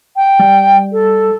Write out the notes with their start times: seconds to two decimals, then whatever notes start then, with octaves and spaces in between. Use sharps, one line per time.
0.16 G5
0.40 G3
0.93 A4